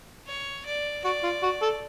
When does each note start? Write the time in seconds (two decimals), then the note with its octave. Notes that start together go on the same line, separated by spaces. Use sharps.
0.27 C#5
0.66 D5
1.04 F#4 D5
1.23 F4
1.43 F#4
1.62 A4